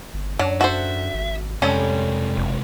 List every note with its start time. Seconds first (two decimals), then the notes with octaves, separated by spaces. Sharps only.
0.14 G1
0.39 F#2 F#3 D4
0.61 F#4 A4 C5 E5
1.14 G#1
1.62 F2 C3 G3 G#3 C#4 A4
2.37 F#1